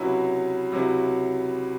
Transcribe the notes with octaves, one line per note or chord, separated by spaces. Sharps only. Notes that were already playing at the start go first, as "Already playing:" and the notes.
Already playing: C#2 C3 F#3 C#4 E4
C#2 C3 F#3 C#4 E4